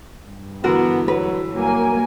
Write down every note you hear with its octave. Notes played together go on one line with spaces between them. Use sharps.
G2
D3 E3 B3 F#4 A#4
F#3 B4
G2 F#3 A#3 G#5